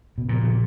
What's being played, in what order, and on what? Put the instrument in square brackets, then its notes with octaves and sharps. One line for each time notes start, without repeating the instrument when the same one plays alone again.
[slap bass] B2
[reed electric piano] F2 C#3 F3 B3 [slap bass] A#2